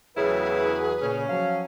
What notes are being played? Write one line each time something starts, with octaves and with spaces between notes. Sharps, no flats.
E2 A2 C#3 F#3 E4 G#4 B4
A#2 C#3 C#4
F3 F#3 F5